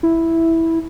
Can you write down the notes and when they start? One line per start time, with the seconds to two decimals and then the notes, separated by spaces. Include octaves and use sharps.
0.03 E4